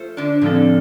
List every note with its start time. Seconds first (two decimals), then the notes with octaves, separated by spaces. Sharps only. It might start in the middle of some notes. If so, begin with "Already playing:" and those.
Already playing: A3 F4 C5
0.17 D3 D4
0.41 A2 D3 F3 C4 D4 A4